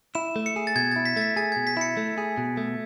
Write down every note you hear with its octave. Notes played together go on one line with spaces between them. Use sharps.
E4 E7
A3
C#7
G#4
A6
B2 G#6
E4 A6
B6
A3 A6
B6
G#4 A6
B2 G#6
B6
E4 C#7
A3
G#4
B2
A3